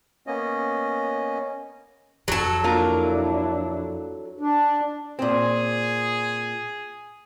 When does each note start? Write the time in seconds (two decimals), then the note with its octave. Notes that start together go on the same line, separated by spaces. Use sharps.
0.27 A#3 B3 C#4 D#5
2.28 F2 F#3 A4
2.64 A#3 D4 E4 F4 A#4
4.38 D4
5.19 A#2 C4 G#4